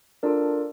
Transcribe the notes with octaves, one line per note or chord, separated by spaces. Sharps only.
D4 F4 A4 A#4 D5